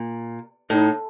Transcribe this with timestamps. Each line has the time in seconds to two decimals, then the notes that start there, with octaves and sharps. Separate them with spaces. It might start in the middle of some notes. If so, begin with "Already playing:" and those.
Already playing: A#2
0.70 A2 D#4